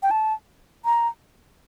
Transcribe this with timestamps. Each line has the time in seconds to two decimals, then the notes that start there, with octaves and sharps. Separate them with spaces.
0.03 G5
0.11 A5
0.85 A#5